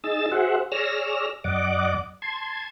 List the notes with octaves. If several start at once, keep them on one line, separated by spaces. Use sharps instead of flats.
D#4 G#4 D#5 E6 A6
F#4 G#4 C5 E5 F#5
G#4 C#5 D5 E6 F6 A#6
F#2 D5 D#5 F#5 D6
A5 C6 G#6